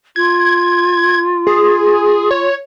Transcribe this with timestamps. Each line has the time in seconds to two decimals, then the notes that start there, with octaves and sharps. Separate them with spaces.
0.16 F4 G#6
1.47 G#4
2.31 C#5